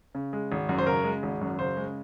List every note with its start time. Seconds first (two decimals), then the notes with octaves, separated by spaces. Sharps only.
0.15 C#3
0.33 G#3
0.52 G#1
0.69 F#2
0.78 C5
0.87 C#3 A#4
1.04 G#3
1.23 G#1
1.41 F#2
1.59 C#3 C5
1.77 G#3